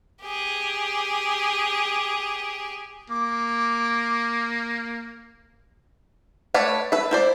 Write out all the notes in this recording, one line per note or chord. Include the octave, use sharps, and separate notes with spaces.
G4 G#4
A#3 D6
A3 B4 C#5 D5
B4 E5
E4 C5 D5